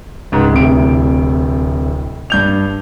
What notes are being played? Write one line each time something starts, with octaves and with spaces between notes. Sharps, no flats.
C#2 G#2
D1 A2 C3 D7
G2 G6 F7